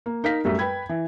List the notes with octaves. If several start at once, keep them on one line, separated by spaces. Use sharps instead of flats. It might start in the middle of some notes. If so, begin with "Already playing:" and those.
A#3
D#4 A#4 F5 B6
F#2 G3 A3
B4 G5 B5 G#6
E3